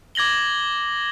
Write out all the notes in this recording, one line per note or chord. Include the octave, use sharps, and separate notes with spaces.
D6 G#6 A#6 F#7 G7